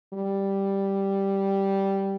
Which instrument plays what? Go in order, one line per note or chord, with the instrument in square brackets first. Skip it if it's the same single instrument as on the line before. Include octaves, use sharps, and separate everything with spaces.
[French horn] G3